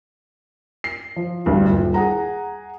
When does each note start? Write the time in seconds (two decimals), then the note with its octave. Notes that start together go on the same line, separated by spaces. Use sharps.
0.84 C7
1.16 F3
1.46 A1 D2 G2
1.70 D#1
1.94 G#4 F#5 A#5